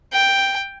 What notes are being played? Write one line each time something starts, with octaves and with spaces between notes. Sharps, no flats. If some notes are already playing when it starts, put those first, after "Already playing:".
G5